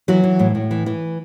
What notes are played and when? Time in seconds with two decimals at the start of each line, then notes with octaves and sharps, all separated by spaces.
0.08 E3 F#3 F#4
0.24 E3
0.39 A2
0.55 A2
0.71 E3
0.86 E3